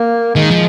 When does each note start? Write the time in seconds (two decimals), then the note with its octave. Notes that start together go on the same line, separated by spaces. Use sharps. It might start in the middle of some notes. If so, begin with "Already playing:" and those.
Already playing: A#3
0.35 D#3 G#3
0.51 F3